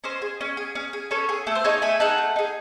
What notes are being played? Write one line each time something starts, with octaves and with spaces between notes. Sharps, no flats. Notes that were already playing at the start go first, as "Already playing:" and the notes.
C#4 C5 D#5
G#4
C#4
G#4
C#4
G#4
C#4 A4 C#5
G#4
A3 A4
C5
D#4 G#4 A4 C#5
A3 E5 G#5
D#4 G#4 F#5 A5
A3
D#4 G#4